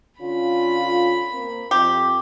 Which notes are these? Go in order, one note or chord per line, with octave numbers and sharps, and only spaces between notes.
D3 C#4 F4 B5
A#3 C4
F2 G4